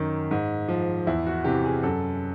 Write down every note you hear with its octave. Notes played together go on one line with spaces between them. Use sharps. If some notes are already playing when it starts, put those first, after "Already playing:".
Already playing: F#2 D#3
G#2
F3
E2 E4
F#4
C3 E3 G4
G#4
F#2 A4